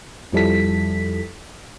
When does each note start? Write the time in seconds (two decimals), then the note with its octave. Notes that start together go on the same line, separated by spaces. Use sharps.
0.33 F2 F3 G3 E4 A4 B6